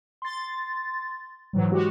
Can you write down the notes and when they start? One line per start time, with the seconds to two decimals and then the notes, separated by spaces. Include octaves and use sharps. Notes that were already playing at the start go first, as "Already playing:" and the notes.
0.22 C6 A6
1.53 G#2 E3 F#3
1.71 G#3 F#4 G4